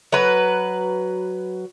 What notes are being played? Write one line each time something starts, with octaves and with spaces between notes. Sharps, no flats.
F#3 B4